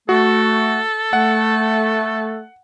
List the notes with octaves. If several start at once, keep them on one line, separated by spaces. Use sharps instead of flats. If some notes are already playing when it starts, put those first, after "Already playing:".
A3 F#4 A4
A3 F#5